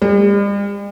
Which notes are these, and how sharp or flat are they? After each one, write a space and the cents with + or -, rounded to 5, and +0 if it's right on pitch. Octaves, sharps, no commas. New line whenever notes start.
G3 +45